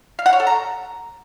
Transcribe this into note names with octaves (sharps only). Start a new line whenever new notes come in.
F5
F#5
C#5
A4
A#5